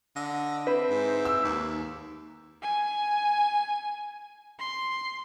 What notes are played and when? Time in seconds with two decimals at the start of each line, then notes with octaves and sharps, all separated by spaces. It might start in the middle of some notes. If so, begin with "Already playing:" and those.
0.16 D3 D#5
0.67 C4 E4 B4 E5
0.89 G#2
1.25 E6
1.44 D#2
2.62 G#5
4.59 C6